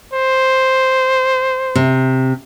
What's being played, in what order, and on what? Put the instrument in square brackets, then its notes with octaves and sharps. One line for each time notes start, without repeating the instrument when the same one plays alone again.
[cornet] C5
[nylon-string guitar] C3